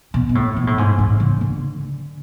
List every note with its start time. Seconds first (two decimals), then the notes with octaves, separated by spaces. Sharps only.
0.14 B2
0.29 B2
0.35 A2
0.56 B2
0.67 A2
0.78 G#2
0.99 A2
1.20 C#3
1.41 D3